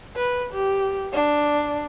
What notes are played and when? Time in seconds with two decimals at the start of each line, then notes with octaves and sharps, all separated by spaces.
0.16 B4
0.53 G4
1.13 D4